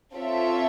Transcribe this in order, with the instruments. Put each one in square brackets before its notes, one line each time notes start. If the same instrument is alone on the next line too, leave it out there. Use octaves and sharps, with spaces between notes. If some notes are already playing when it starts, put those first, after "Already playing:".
[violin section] C4 F4 A4 C#5 E5